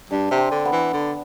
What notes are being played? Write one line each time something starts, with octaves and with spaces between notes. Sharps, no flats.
G2 D4
C3
C4
D3
B3
E3
D3